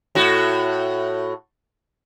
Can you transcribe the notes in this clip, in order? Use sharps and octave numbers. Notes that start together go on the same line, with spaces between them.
A2 F#4